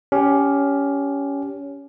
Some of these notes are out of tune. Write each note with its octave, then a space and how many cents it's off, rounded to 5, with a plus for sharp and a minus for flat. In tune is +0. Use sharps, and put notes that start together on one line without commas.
C#4 +20 G4 +0